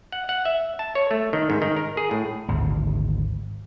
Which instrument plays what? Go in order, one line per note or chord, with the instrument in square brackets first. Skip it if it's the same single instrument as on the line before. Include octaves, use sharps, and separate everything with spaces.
[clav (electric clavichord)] F#5
F#5
E5
A5
C#5
A3
D#3
G#2
D#3
A#4
G#4
A2
[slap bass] G#1 D2